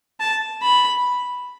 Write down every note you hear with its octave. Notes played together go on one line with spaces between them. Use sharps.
A5
B5